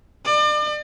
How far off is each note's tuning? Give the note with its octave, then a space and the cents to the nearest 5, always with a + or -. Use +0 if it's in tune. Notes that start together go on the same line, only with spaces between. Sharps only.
D5 +40